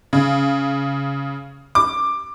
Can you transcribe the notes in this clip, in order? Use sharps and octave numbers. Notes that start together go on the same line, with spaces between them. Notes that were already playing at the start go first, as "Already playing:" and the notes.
C#3
D6